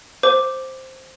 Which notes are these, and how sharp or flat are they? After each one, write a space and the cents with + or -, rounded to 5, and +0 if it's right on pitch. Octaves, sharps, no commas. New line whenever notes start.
C5 +0 D6 +0